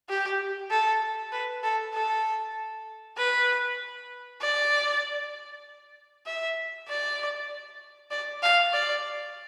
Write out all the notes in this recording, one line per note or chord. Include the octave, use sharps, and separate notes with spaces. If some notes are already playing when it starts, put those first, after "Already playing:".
G4
A4
B4
A4
A4
B4
D5
E5
D5
D5
F5
D5